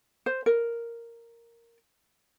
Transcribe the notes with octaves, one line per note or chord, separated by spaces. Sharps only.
C5
A#4